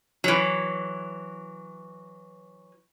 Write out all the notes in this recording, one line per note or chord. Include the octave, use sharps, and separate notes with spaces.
E3 F#3